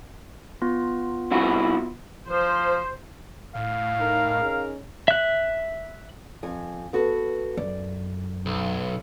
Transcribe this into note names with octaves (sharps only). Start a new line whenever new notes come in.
B3 F4
C2 E4 F#4
F3 C5
A2 F5
D#4 A#4
C#4 D#4 G#4
E5 F#6
F2 G#5
B3 F#4 A4
F#2 D5
B1